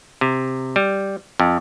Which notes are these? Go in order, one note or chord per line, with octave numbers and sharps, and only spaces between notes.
C3
G3
F2